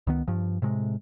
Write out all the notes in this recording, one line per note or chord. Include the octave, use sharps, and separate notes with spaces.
C#2 D#3 B3
G2 F3
A2 C3 G#3